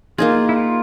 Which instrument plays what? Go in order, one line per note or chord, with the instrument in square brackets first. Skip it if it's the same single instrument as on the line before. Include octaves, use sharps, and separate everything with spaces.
[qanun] A#3 D#4 G#4 [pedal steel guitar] F4
[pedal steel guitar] E4
F4